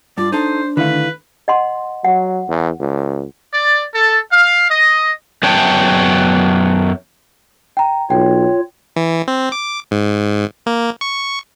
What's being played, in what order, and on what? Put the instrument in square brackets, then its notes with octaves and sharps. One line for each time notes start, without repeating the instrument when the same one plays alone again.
[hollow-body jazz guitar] G2 [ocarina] F4 [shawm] D5
[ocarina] D4 [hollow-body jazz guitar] D#4 A4 [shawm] C5
[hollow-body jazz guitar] D3 A3 [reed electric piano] D#3 E4 F5 [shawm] B4
[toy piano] D#5 F#5 C6
[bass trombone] F#3 [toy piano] F#5
[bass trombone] E2
C#2
[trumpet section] D5
A4
F5
D#5
[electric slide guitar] F#2 B3 C#4 C#5 G5 A5
[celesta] G5 A#5
[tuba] B1 [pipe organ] F4 C#5 [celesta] G5
[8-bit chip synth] E3
C4
D6
G#2
A#3
C#6